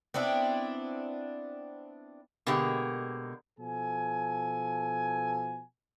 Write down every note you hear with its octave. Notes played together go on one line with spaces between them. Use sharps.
B3 C4 D4 E4
B2 D3 G#3 A#3 G4
B2 F3 A4 G#5